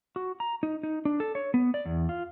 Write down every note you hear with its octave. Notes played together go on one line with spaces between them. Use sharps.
F#4
A#5
D#4
D#4
D4
A4
C#5
B3
D5
E2
F4